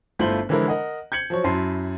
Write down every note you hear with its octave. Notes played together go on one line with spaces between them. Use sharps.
G1 A3 E4 F4 C5 F#7
D3 E3 F3 G#3 E4 A#4
A#4 D#5 F#5
G6 G#6 C#7 F#7
F3 F#3 C#5
F#2 E4 A5 C6 C7